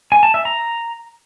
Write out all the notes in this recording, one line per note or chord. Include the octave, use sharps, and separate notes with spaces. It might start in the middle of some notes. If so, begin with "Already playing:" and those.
G#5
A5
E5
A#5